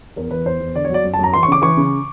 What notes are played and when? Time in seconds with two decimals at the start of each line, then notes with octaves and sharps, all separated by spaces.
0.16 E2 A#4
0.31 E3 B4
0.45 E2 C5
0.60 E2
0.75 D3 D5
0.85 C#5
0.90 F#3 D5
1.04 F#2
1.14 A5
1.19 F#2 A#5
1.33 E3 C6
1.43 C#6
1.48 C#3 D6
1.62 E3 C#6
1.77 C#3